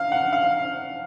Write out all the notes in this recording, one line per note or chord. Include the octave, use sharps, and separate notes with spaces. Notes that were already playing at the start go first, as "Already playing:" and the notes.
Already playing: F5
F#5
F5